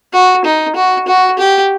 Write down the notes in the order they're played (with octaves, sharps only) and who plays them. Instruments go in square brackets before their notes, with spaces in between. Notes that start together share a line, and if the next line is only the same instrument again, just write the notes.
[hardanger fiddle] F#4
D#4
F#4
F#4
G4